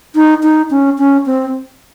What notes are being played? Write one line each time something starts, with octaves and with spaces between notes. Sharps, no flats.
D#4
D#4
C#4
C#4
C4